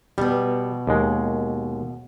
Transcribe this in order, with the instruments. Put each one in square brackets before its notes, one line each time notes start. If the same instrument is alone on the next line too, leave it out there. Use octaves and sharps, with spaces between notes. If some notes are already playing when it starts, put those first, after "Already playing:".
[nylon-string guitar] B2 B3 [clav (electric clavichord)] G3
[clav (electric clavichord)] D#2 G#3